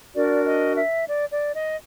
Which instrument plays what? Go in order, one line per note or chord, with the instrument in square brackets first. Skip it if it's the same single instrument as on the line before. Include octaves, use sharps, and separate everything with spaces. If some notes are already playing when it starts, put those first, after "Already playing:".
[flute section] D4 F#4 A#4 D5
D#5
E5
D5
D5
D#5